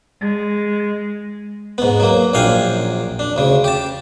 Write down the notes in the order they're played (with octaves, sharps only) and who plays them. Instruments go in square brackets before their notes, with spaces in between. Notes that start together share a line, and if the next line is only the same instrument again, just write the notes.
[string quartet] G#3
[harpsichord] G#2 B3
F#3 A#3
A#1 F#2 D4 F5 G5 G#5
D4
D2 C#3
G4 A5